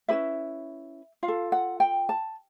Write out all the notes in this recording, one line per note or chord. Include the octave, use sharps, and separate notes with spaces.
C#4 E4 G4 B4 E5
F4 F5
A4
F#5
G5
A5